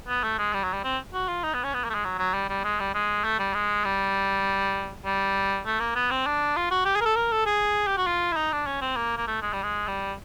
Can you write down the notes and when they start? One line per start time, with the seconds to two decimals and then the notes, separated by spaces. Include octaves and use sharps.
0.08 B3
0.23 A3
0.38 G#3
0.54 G3
0.64 F#3
0.73 G3
0.84 C4
1.13 F#4
1.28 F4
1.44 D#4
1.54 B3
1.64 C#4
1.74 B3
1.84 A#3
1.90 A3
1.95 G#3
2.05 F#3
2.19 F#3
2.34 G3
2.49 G3
2.64 G#3
2.80 G3
2.94 G#3
3.24 A3
3.39 G3
3.54 G#3
3.85 G3
5.05 G3
5.66 A3
5.80 A#3
5.95 B3
6.11 C4
6.26 D4
6.56 F4
6.71 F#4
6.85 G4
6.96 G#4
7.01 A#4
7.05 A4
7.16 A#4
7.32 A4
7.46 G#4
7.87 G4
7.97 F#4
8.06 F4
8.32 E4
8.36 D#4
8.52 D4
8.66 C#4
8.81 C4
8.96 A#3
9.17 A#3
9.27 A3
9.42 G#3
9.53 G3
9.63 G#3
9.88 G3